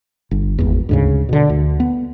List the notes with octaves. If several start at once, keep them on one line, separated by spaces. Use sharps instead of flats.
G1
G#1 E2
D2 G#2 C#3
B2 D3
D2
B3